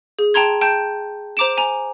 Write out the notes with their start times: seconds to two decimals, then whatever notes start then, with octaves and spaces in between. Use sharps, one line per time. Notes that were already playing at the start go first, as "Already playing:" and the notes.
0.19 G#4
0.34 G5 A5 A#5 C6 G#6
0.61 G5 A5 G6
1.37 C5 A#5 D6 D7 E7
1.57 G#5 A#5